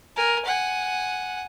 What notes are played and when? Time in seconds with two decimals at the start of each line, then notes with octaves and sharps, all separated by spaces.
0.16 A#4 G#5
0.45 F#5 G#5